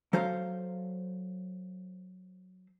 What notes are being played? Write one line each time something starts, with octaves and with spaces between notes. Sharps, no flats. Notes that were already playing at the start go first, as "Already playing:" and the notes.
F#3 A4 C5 F5